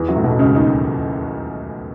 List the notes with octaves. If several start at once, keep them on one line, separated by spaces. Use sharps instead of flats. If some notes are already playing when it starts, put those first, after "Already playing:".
Already playing: E2 E3
F#2 F#3
A2
B1 B2
C#2 C#3
D#2 D#3